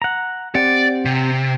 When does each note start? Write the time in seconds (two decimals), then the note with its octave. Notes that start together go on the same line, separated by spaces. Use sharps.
0.02 F#5 A#5
0.55 C4 G4 D5 F#5
1.05 C3